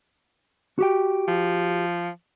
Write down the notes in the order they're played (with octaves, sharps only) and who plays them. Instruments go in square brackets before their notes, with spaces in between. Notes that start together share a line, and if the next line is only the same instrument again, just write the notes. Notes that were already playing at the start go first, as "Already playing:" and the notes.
[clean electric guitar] F#4 G4 G5
[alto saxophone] F3